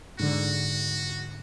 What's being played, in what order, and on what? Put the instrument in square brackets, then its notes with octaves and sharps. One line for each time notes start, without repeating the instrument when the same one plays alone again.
[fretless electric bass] G#2 D3 [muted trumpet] F#4